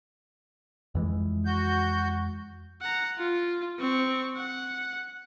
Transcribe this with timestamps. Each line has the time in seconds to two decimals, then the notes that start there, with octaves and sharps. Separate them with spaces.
0.95 F2 E3 G#3
1.45 F#4 G6
2.82 F#5 A#5
3.19 F4
3.79 C4 C#6
4.36 F#5